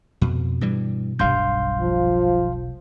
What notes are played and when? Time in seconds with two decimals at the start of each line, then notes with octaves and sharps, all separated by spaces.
0.22 F2 B2
0.61 G2 E3 G3
1.19 E1 B1 G2 G3 F5 C6 G6
1.81 F3